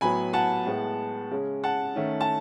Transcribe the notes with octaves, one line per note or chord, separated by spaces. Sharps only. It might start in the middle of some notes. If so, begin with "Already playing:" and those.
A2 F#3 B3 G#5 B5
F#5 A5
A2 G#3 B3
C#3 G#3 C#4
F#5 A5
D#3 A3 C#4
A5